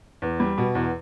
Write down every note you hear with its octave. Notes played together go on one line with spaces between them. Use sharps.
E2
G3
B2
E2